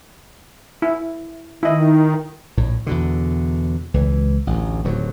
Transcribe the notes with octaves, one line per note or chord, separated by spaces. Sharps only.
E4
D#3 E4 D#5
A#1 A2
E2 B2 D3
C#2 E3
A1 D2
D1 D#2 F#3